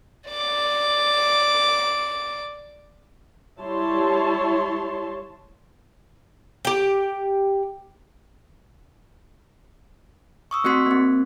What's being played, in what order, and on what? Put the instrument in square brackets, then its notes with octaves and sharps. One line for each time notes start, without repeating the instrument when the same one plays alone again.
[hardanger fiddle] D5 D6
[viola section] G3 E4 C#5 A5 C6
[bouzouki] G4 G5
[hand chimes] C#6 D#6 E6
A3 C4 F#4 C6 B6
A#3 C4